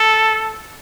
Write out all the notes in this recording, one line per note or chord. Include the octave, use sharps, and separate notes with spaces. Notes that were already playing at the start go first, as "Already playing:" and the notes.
Already playing: A4